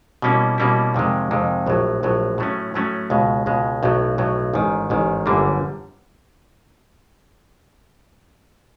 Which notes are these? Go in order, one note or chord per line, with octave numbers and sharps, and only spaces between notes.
B2 G3 A#3 C#4 E4
B2 G3 A#3 C#4 E4
F2 C3 D#3 G#3
F2 C3 D#3 G#3
A#1 A2 F#3
A#1 A2 F#3
A2 F#3 A3 C#4
A2 F#3 A3 C#4
C#2 B2 G#3
C#2 B2 G#3
B1 A2 F#3
B1 A2 F#3
A1 G#2 D#3
A1 G#2 D#3
G1 F#2 D3 G3 A#3